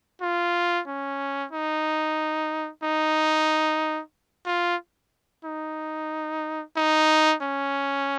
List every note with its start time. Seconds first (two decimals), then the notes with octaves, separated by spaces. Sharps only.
0.22 F4
0.87 C#4
1.52 D#4
2.83 D#4
4.46 F4
5.45 D#4
6.77 D#4
7.42 C#4